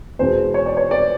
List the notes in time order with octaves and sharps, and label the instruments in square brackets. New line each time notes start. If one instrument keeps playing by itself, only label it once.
[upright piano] E2 B2 G#3 C5
C#5
D5
C#5
D5